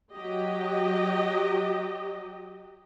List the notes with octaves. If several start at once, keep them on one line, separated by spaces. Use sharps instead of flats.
F#3 G4 D#5